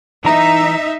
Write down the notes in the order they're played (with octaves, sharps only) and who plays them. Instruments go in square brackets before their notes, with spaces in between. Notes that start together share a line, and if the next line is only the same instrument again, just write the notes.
[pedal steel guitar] E3 A#5 [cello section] D#4 E5